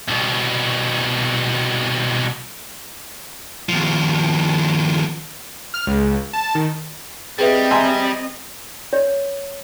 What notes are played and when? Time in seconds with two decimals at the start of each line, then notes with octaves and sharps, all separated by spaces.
0.09 C2 B2
3.69 D#2 F3
5.74 F6
5.87 C#2
6.33 A5
6.55 D#3
7.38 G3 C4 G#4 B4 D#5 E5
7.71 E5 G#5 A#5 C6
8.93 C#5